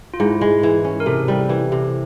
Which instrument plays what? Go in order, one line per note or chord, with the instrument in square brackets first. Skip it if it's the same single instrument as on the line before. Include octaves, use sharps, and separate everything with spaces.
[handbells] F4
[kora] G#2 [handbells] E4
[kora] G#3
E3
C#4
[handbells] A#4
[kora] C3 [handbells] A4
[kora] G3
E3
C3